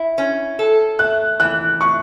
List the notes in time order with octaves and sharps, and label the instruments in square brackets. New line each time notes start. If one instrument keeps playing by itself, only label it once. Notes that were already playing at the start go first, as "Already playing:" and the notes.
Already playing: [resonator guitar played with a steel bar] E4
C#4
A4
[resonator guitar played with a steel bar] A3 [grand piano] F#6
[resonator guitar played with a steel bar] E3 [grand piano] F#6
[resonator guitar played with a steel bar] A2 [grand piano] C#6